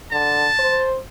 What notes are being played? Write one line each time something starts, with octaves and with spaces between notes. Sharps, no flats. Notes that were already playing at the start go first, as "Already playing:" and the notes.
D3 A5
C5